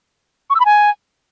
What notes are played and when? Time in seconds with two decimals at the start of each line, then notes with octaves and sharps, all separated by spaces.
0.50 C#6
0.55 E6
0.60 B5
0.65 G#5